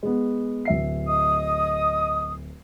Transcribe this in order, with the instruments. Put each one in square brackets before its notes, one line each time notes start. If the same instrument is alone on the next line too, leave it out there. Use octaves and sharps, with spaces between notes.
[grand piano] G#3 B3
D1 E5 C7
[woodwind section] D#5 D#6